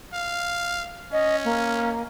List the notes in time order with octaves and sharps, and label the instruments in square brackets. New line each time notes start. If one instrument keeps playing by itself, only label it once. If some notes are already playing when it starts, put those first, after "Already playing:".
[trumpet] F5
[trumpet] C#4 [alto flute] D#5
[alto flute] A#3